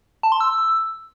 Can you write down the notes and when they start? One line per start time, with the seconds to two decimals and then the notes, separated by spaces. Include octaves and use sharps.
0.23 A5
0.32 C6
0.41 E6